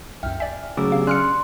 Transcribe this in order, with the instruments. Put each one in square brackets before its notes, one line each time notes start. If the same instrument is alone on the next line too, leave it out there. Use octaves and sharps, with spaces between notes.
[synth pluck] C2 F#2 [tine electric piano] E5 [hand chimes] G5 F6
[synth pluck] D5 E5 [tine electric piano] G#5
[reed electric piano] C#3 F#3 [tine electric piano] A3 [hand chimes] G#4 D6 E6
[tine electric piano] B3 G4 [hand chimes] D4 [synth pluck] F5
[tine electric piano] C#4 D5 F#6 [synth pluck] G#5 F6 C#7 [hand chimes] C6